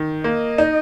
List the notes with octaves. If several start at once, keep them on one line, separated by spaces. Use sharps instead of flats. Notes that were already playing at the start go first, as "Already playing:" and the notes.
Already playing: D#3
A#3 D#5
D#4